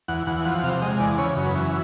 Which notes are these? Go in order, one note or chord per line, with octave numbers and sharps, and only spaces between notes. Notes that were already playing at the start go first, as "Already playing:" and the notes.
E2 F#5
E2 F#5
F3 F#5
C3 F5
G#3 D#5
E2 D5
C#3 C#5
F#2
B4
E3